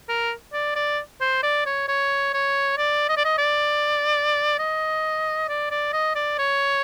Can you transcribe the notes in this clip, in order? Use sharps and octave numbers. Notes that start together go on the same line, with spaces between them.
A#4
D5
D5
C5
D5
C#5
C#5
C#5
D5
D#5
D5
D#5
D5
D#5
D5
D5
D#5
D5
C#5